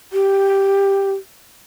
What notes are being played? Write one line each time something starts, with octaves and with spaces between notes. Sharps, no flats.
G4